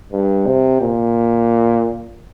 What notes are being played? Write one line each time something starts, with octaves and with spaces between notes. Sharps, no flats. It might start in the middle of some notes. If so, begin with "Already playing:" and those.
G2
C3
A#2